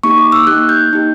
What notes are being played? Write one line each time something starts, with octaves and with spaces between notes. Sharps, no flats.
A#3 D#4 G4 C#6
D6
E6
A#3 D#4 G4 F#6
G6
A#3 D#4 G4